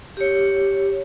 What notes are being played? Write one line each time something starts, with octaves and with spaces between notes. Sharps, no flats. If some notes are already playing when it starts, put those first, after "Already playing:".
G4 C#5